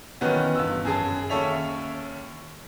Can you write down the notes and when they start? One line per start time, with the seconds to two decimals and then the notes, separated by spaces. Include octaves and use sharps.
0.21 D#3 E3 F#3 B3 C#4
0.55 G1 E6
0.85 F#2 G#4 A5
1.30 D#2 C#4 A4 C#5 E5 F7